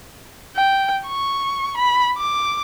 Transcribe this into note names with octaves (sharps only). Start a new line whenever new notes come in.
G5
C#6
B5
D6